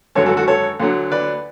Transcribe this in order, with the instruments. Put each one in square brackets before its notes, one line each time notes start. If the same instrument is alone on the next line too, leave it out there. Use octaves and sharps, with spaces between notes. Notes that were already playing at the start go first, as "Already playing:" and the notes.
[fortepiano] G#1 F#2 D3 F#3 A4 C#5
F#4 A4
F#4 A4
A4 C#5
D2 D3 F#3
B4 D5